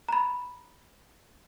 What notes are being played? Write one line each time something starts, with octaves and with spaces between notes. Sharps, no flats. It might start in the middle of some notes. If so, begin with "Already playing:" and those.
A#5 B5